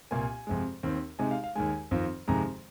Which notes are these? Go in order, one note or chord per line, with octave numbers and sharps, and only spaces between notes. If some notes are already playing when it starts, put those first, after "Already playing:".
C2 A#2 A#3 G#5
F2 C3 G#3
D#2 D#3 C4
C3 G#3 D#4 G#5
F5
F5
D#2 D#3 G#3 G#5
F2 D#3 C4 F4
F2 C3 D#3 G#3 A#5